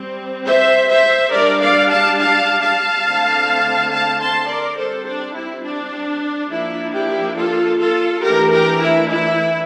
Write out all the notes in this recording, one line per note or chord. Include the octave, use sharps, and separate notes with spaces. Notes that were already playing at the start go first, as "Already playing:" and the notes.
Already playing: G3 C4
C5 E5
C5 E5
G3 D4 A#4 D5
D5 F5
F5 A5
F5 A5
F5 A5
D3 A3 C4
F5 A5
A5 C6
A#4 D5
G3 C4 A4 C5
D4
E4
D4
F3 A#3 D4 E4
E4 G4
F4 A4
F4 A4
E3 A3 D4 G4 A#4
G4 A#4
E4
E4